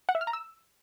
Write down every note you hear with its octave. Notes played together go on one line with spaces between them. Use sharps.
F#5
E5
F6
A#5
E6